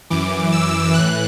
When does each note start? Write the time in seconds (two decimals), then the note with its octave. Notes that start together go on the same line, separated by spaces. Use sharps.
0.10 F#2 E3 D6
0.52 E6
0.94 A2 E3 F#6